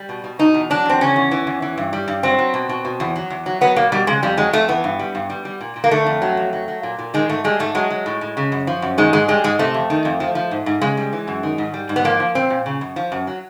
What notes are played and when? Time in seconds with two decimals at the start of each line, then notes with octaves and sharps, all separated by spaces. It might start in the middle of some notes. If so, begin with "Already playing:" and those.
Already playing: G3
0.09 B2
0.24 B2
0.39 B2 D#4
0.54 E2
0.70 F#3 D4
0.86 E2 C4
1.01 C#3 C#4
1.16 E2
1.31 E3
1.47 E2
1.62 E3
1.78 G2
1.93 G3
2.08 G2
2.23 F#3 C4
2.39 F#3
2.54 B2
2.69 B2
2.85 B2
3.00 E2
3.16 F#3
3.30 E2
3.46 F#3
3.61 F#3 B3
3.76 B2 A#3
3.92 B2 G3
4.07 C#3 G#3
4.23 F2 G3
4.37 F#3 G#3
4.53 F2 A3
4.68 E3 B3
4.84 G2
4.99 G3
5.15 G2
5.30 G3
5.45 G3
5.61 A#2
5.76 A#2
5.84 A#3
5.91 D3 A3
6.06 F2
6.22 F#3
6.37 F2
6.53 F#3
6.68 F#3
6.83 A#2
6.99 A#2
7.14 D#3 G#3
7.29 G#2 A3
7.44 G3 G#3
7.59 G#2 A3
7.75 F#3 G#3
7.90 F#3
8.06 A2
8.21 A2
8.37 C#3
8.52 F#2
8.67 F3
8.82 F#2
8.98 D#3 G#3
9.13 G#2 G#3
9.28 G3 G#3
9.44 G#2 G#3
9.59 C3 A3
9.74 F2
9.90 D#3
10.05 F2
10.20 F3
10.35 F3
10.51 G#2
10.66 G#2
10.81 C#3 G#3
10.97 G3
11.13 E3
11.28 F#2
11.43 D#3
11.58 G#2
11.74 G3
11.89 G#2
11.96 B3
12.04 F3 A#3
12.20 F3
12.35 A#2 C4
12.50 A#2
12.66 C#3
12.81 F#2
12.96 F3
13.12 F#2
13.27 F#3